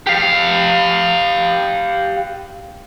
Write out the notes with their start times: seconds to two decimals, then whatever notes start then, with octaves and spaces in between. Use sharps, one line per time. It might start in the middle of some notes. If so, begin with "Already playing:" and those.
0.07 G4 F5